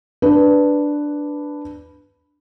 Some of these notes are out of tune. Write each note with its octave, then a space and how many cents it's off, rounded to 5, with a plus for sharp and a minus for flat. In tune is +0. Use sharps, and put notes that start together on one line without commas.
D4 +0 B4 +0